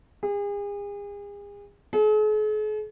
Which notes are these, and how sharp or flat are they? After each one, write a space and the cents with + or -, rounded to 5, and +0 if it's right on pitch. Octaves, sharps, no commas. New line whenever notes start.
G#4 -40
G#4 +45